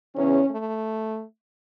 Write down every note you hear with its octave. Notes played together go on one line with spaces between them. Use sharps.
E2 C#3 E3 C#4
A3